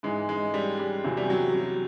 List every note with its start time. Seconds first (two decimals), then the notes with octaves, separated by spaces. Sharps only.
0.03 G#2 E3 G#3
0.29 G#3
0.54 G3
0.79 G3
1.04 E2 C3 E3 F#3
1.17 G3
1.30 F#3
1.55 F#3